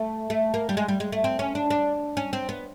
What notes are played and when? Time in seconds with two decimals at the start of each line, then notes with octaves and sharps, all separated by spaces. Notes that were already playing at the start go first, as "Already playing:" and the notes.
Already playing: A3
0.30 A3
0.54 A#3
0.69 G3
0.77 G#3
0.88 G3
1.00 G#3
1.12 A3
1.24 C4
1.39 C#4
1.55 D4
1.70 D4
2.17 C#4
2.33 C4
2.49 B3